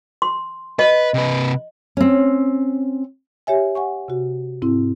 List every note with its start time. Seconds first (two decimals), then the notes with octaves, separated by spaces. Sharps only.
0.22 C6
0.79 B4 D#5
1.14 C3 B4
1.97 C4 C#4
3.47 G4 C#5 E5 G#5
3.75 F#5 G#5 C#6
4.08 C3 F#4
4.62 G#2 C4 E4